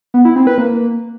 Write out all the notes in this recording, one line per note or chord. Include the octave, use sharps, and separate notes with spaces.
B3
E4
C4
B4
A#3